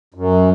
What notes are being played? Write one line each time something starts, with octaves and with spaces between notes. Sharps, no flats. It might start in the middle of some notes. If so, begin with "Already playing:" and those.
F#2